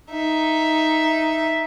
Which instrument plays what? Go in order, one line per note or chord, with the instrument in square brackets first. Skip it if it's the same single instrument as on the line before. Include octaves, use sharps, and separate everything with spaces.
[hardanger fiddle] D#4 E5